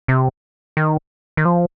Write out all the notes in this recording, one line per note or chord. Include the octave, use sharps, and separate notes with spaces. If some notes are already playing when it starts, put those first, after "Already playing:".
C3
D#3
D#3
F3